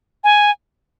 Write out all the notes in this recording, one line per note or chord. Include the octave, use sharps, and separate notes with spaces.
G#5